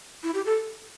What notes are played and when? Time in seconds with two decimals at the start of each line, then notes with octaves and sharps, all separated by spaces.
0.23 E4
0.34 G4
0.46 A4